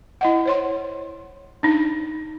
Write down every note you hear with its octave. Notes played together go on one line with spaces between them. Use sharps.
E4 D#5 F#5
C5 C#5 C6
D4 D#4